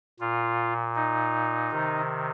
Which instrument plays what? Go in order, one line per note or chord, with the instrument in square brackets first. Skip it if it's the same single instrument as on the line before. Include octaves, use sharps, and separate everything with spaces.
[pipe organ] A#2 F4
D#4
C3 D#3